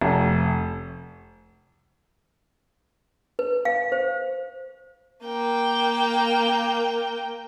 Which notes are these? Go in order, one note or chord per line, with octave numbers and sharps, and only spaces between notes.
F1
B4
F5
C5
A#3 G5